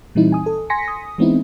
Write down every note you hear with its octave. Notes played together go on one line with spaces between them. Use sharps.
A#2 E3 G3 C4 D#4 E4
G#5 D#6
A4
G#5 C6 A#6 B6 C#7
D#6
E3 G#3 B3 C4 D#4 E4